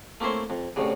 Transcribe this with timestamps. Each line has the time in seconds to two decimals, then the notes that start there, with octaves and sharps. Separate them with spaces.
0.20 A3 A#3 C4 E4 C5 C#5
0.50 F2
0.76 C2 A2 C#3